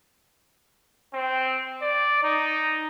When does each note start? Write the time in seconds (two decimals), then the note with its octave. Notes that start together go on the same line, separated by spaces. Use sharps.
1.14 C4
1.82 D5
2.23 D#4